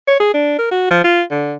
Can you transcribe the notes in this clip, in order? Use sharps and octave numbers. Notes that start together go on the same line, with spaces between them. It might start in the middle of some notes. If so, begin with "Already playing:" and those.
C#5
G#4
D4
A#4
F#4
F3
F4
D3